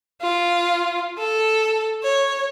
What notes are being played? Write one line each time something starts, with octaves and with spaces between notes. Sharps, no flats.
F4
A4
C#5